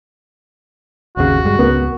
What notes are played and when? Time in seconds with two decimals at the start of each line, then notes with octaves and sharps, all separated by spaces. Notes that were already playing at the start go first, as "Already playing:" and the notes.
1.17 G#1 D#2 C#3 F#4
1.44 G2 G#3
1.59 C#2 B3 A#4